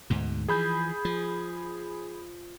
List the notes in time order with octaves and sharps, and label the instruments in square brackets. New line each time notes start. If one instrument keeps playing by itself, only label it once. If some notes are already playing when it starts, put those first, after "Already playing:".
[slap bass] D2 G#2 B2
[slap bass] E3 F3 [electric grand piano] G#4 B5 G6
[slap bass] F3